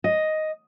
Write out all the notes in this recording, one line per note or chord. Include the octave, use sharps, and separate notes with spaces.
D#5